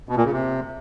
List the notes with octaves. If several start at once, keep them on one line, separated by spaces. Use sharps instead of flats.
B2
A#2
C#3
C3